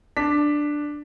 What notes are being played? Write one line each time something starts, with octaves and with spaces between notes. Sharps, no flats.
D4 B6